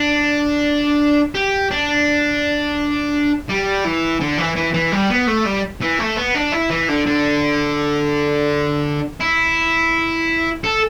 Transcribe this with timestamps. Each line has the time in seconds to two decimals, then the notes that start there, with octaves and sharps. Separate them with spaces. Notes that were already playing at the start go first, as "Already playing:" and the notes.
Already playing: D4
1.34 G4
1.71 D4
3.49 G3
3.85 E3
4.21 D3
4.38 E3
4.56 E3
4.74 E3
4.92 G3
5.10 B3
5.27 A3
5.46 G3
5.81 E3
5.99 A3
6.17 B3
6.35 D4
6.52 E4
6.70 E3
6.89 D3
7.06 D3
9.21 E4
10.64 A4